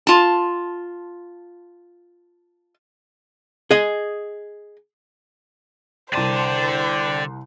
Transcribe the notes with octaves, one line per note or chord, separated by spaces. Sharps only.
F4 A5
G#4 D#5
C2 D3 C5 D5 G5 A5 C6 D#7